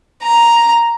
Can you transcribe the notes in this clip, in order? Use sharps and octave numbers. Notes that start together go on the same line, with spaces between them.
A#5